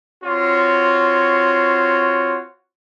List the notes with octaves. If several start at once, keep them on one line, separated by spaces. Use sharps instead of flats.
C4 F4 F#4 C#5